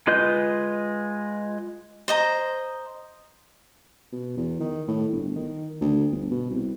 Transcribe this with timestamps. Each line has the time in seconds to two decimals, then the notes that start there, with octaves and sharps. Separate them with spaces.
0.07 G#3 F4 B4 D#5 G6
2.08 C5 D#5 A#5
4.12 B2
4.37 E2
4.61 D#3
4.88 A2
5.12 G1
5.36 D#3
5.81 D2
6.12 G1
6.31 B2
6.50 C2